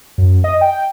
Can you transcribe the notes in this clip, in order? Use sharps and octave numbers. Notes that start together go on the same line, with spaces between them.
F#2
D#5
G5